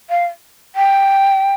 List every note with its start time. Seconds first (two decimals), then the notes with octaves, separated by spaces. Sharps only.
0.10 F5
0.75 G5